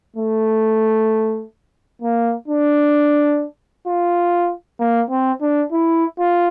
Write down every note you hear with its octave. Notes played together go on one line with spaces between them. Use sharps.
A3
A#3
D4
F4
A#3
C4
D4
E4
F4